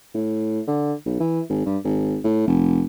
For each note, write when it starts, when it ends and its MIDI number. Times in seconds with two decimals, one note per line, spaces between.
0.14 0.61 45
0.68 0.93 50
1.06 1.19 35
1.20 1.41 52
1.50 1.64 32
1.66 1.78 43
1.84 2.18 32
2.24 2.42 45
2.47 2.85 29